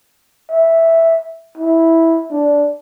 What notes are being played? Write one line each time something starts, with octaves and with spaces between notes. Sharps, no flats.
E5
E4
D4